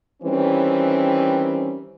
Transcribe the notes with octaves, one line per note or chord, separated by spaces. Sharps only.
D#3 E3 G3 C4 C#4